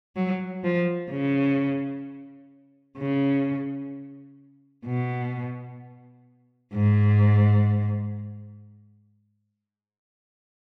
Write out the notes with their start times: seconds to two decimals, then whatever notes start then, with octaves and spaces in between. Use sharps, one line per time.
0.16 F#3
0.64 F3
1.11 C#3
2.98 C#3
4.86 B2
6.73 G#2